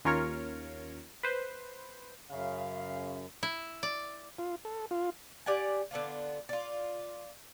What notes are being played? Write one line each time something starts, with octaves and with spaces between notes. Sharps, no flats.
D#2 C#4 F4 A#4 C#5 F6
B4 C5
F#2 C#3 E5 F5
E4
D5
F4
A4
F4
G4 D5 F#5 G#5
D3 B3 D4 F4
F4 D5